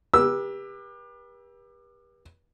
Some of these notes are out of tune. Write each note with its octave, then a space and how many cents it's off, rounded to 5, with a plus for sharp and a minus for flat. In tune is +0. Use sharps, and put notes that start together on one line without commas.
G4 +25 B4 -40 E6 +0